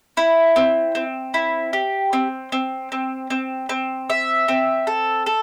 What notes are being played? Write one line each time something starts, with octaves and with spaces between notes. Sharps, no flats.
E4
C4
C4
E4
G4
C4
C4
C4
C4
C4
E5
C4
A4
A4